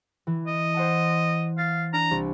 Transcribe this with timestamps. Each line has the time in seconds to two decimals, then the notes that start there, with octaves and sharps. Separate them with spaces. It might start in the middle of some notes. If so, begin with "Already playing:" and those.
0.27 E3
0.47 D#5
0.74 C5 F#5 A5
1.58 F5 A6 C7
1.93 D4 A#5
2.11 C2